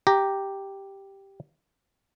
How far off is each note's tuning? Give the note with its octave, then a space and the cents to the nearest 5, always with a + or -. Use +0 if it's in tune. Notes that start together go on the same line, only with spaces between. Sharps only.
G4 +0 A#5 +0